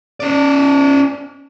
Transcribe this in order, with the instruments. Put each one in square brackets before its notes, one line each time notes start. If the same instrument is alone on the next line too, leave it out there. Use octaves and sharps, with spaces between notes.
[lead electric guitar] C#4 D5